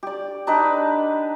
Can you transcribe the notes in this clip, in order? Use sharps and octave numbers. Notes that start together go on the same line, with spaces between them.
G4 D5
D4 D#4 G4 B4